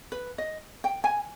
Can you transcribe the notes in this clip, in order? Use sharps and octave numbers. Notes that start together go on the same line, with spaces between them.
B4
D#5
G5
G#5